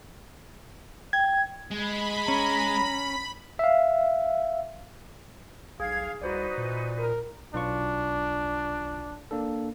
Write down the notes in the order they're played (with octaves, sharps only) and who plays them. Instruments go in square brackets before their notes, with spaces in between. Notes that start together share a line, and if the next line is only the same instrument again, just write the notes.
[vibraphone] G5 [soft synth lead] G#6
[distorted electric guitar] G#3 [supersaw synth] B5
[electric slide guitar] C#4 [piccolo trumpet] A#5
[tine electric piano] E5 F5
[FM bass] B1 [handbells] G#4 [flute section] F5 G#6
[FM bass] C2 [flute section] D#4 B4 [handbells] F#4 C5 D5
[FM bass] A#2
[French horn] A#4
[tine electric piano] B1 F4 C#6 [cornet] D4
[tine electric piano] A#3 D4 A4